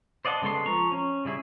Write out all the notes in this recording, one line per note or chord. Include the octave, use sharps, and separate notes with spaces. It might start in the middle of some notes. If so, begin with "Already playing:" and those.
C5 D5 D#5 F#5 A5
C#3 G#3 B3 A4 C6
F3 A#5 C#6
C#4
C#3 G3 E4 G#4